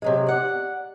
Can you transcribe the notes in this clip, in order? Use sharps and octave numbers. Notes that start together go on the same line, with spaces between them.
C3 F#3 G#3
D5 F#5